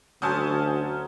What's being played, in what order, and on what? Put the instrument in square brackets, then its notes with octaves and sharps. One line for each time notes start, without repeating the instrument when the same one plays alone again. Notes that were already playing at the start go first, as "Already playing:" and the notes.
[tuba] D2 [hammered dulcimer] F#3 C#4 C5 [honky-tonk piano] G#5 A5 D#6